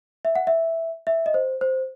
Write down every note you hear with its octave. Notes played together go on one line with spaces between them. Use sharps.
E5
F#5
E5
E5
D#5
C5
C5